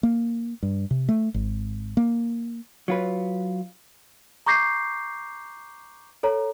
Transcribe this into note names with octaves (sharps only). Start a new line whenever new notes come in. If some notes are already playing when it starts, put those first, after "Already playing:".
A#3
G2
C3
A3
G#1
A#3
F#3 F4 B4
A#5 C#6 D6 G6 A#6 C7
A4 C#5 A#5